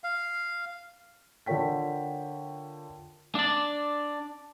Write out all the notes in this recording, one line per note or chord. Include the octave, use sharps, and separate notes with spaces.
F5
D3 F4 A#4 C#5 G5 B6
D4 D5